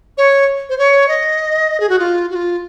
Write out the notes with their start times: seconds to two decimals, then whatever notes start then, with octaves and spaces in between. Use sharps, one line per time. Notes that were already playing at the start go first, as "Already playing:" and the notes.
0.18 C#5
0.69 C5
0.78 C#5
1.08 D#5
1.80 G#4
1.89 F#4
1.99 F4
2.30 F#4
2.35 F4